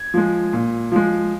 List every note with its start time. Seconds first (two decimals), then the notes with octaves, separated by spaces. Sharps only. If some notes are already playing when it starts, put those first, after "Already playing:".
Already playing: G#6
0.14 F3 G#3
0.53 A#2
0.92 F3 G#3